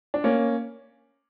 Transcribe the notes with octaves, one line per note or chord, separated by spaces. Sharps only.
D4
A#3 C#4